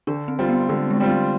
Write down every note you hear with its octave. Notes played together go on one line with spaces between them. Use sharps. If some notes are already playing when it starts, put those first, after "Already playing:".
D3 D4
C4
G3 C4 F4
B3
D3 G#3
G#3
G3 C4 F4
G#3